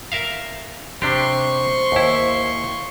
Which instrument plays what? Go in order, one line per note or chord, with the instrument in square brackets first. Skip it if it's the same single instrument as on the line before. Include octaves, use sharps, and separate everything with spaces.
[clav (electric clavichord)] A#4 E5 F5
[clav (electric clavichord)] C3 D4 G4 [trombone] C5 [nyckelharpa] C6 C#6
[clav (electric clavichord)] D#2 E4